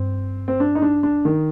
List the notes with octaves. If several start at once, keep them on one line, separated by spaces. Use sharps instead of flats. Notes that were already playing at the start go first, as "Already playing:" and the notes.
Already playing: G2 C4
C4
D4
D#4
D4
D4
D#3